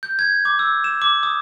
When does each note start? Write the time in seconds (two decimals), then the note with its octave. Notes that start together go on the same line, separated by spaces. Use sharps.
0.03 G6
0.19 G#6
0.45 D6
0.59 E6
0.84 E7
1.02 D6
1.23 D#6